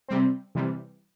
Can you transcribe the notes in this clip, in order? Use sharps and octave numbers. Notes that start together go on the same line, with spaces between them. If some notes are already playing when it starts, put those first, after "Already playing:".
C3 G3 C4
C3 E3 G3